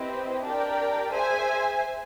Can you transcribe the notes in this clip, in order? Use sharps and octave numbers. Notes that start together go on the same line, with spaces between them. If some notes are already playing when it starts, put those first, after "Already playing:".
Already playing: C4 E4 G4 B4 D#5
D4 G4 A#4 D5 G5
G#4 C5 E5 G#5